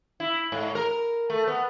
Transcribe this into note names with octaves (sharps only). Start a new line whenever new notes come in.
E4
G#2
A#4
A3
B3